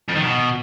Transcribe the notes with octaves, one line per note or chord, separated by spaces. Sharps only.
F2
D#3
B2